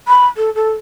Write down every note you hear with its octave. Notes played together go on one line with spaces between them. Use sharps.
B5
A4
A4